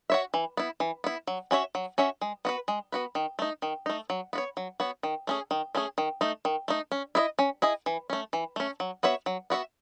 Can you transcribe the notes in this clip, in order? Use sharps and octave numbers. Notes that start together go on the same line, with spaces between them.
F#4 C#5 E5
E3
B3 E4
E3
B3 E4
F#3
C#4 F#4 C#5 E5
F#3
C#4 F#4 C#5 E5
G#3
B3 F#4 B4
G#3
B3 F#4 B4
D#3
A3 D#4
D#3
A3 D#4
F#3
B3 F#4 C#5
F#3
B3 F#4 C#5
D#3
A3 C#4 G#4
D#3
A3 C#4 G#4
D#3
A3 D#4
D#3
A3 D#4
C#4
E4 G#4 D#5
C#4
E4 G#4 D#5
E3
A3 C#4
E3
A3 C#4
F#3
B3 F#4 C#5 E5
F#3
B3 F#4 C#5 E5